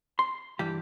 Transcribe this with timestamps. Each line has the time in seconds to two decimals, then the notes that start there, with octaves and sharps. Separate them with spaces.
0.19 C6
0.59 G2 E3 G3 G4